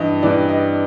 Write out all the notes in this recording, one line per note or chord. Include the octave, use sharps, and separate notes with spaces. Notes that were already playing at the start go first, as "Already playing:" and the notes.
Already playing: G2 E3 D#5
G2 E3 D5
D#5